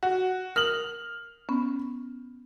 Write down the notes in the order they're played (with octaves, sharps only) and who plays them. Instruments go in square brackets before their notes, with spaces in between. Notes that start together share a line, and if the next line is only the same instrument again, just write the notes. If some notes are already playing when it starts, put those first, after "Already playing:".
[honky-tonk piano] F#4 [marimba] F#5
[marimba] A#4 D#6 [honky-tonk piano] F6 F#7
[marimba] B3 C#4